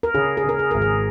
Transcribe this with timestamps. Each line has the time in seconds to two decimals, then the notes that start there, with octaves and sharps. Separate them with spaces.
0.03 A#4
0.14 C#3 G#4
0.37 G#4
0.44 C#3
0.49 A#4
0.59 G#4
0.71 G#1 A#4
0.82 G#4